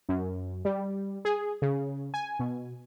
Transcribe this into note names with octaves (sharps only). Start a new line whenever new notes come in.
F#2
G3
G#4
C#3
G#5
B2